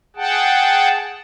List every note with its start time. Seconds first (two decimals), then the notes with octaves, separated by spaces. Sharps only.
0.16 G#4 F#5 G5 A5